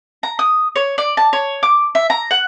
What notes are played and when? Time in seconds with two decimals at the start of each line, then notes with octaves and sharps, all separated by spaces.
0.23 A#5
0.39 D#6
0.76 C#5
0.98 D5
1.17 A5
1.33 C#5
1.63 D6
1.95 E5
2.10 A#5
2.31 F#5